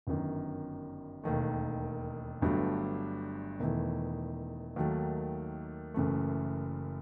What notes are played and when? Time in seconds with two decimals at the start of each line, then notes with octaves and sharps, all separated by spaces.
0.07 G1 F#2 D#3
1.24 E1 D#2 D#3 A3
2.42 G1 G2 F#3 A3
3.59 E1 E2 D#3 A3 E4
4.76 D#2 D#3 F#3 A3
5.94 F#1 F#2 E3 A3